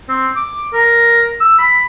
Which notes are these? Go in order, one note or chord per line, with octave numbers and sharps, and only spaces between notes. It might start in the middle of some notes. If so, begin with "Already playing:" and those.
C4
D6
A#4
E6
B5